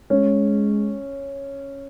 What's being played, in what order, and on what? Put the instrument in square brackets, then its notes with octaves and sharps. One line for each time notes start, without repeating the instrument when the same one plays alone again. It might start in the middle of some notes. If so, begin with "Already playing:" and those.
[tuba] G#3 [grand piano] C#4